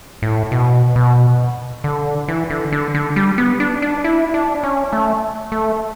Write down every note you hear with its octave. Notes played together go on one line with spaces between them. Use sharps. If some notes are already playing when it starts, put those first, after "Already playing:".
A2
B2
B2
D3
E3
D3
D3
D3
G3
B3
D4
D4
E4
D4
C#4
A3
A3